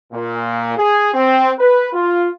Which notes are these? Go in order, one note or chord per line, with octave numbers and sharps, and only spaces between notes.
A#2
G#4
C4
B4
F4